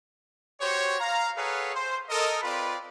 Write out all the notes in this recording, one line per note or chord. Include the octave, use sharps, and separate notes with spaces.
F#4 G4 C5 C#5
F5 A#5
G#4 A4 B4 C#5 F5 F#5
C5
A4 A#4 D#5
C4 F4 B4 D5 B5